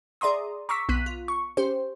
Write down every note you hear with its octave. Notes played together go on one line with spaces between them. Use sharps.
G#4 D5 E5 A#5 C6 D#6
A#5 C#6 D6 E6 B6
B1 B3 F#6 B6 D#7
F4
C#6
C#4 G4 C5